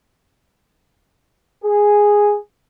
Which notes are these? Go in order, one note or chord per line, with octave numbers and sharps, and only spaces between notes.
G#4